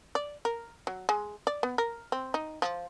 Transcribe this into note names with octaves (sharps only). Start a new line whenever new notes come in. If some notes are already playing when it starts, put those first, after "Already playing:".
D5
A#4
F#3
G#3
D5
B3
A#4
C4
D#4
F3